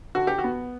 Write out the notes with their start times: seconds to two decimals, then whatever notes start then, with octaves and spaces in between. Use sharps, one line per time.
0.15 D3 F#4
0.27 G4
0.38 F#4
0.44 B3